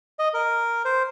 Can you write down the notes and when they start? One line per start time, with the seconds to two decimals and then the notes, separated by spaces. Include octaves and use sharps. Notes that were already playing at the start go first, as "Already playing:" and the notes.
0.19 D#5
0.34 A#4
0.85 C5